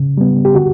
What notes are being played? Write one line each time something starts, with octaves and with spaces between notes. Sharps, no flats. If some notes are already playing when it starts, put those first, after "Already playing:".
Already playing: C#3
G3 B3
G4
D3 F#4